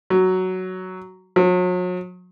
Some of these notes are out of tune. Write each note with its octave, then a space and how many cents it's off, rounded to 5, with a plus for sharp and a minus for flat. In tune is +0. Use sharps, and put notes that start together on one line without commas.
F#3 +5
F#3 -40